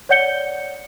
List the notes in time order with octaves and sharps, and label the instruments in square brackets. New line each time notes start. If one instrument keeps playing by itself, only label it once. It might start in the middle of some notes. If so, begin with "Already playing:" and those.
[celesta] C#5 D5 F#5 G6 C#7 G7